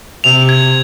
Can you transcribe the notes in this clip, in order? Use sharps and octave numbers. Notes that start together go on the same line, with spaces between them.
C3 F7
G#6